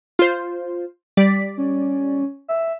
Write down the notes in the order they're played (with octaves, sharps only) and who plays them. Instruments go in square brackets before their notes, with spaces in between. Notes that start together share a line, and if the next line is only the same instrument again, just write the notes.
[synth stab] F4 C5
[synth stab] G3 D5 [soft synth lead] B6
[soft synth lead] C#4
E5